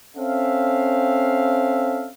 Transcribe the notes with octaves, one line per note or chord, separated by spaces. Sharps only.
C4 C#4 A4 E5 F5